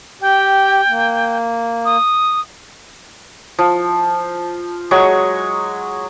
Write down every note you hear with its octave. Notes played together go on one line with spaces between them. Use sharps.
G4 G5
A#3
D#6
F3
F#3 G#3 C#6